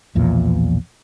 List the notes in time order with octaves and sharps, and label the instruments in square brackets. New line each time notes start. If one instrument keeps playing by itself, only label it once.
[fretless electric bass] B1 E2 A#2 F3